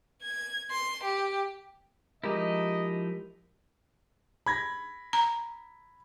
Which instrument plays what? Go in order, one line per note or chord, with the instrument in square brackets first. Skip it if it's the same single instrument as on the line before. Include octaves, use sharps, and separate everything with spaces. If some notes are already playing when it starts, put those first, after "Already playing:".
[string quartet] G#6
C6
G4
[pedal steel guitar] F3 D#4 E4 [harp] G#3 G4 A#4 [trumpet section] D#5
[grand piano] B5 G#6 A#6
[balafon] A#5